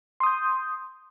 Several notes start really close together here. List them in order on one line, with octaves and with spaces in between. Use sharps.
C6 D#6 G6